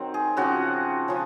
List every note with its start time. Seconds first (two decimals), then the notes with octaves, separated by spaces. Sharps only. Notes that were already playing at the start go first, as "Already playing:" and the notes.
Already playing: D#3 F#3 C4
0.14 G#4
0.37 C#3 F3 C4 F#4
1.08 C#3 F3